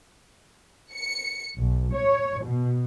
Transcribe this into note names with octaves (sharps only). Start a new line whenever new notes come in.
C#7
B1
C#5
B2